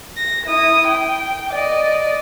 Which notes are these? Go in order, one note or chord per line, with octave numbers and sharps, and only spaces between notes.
A#6
E4 D#6
G5
D5 D#5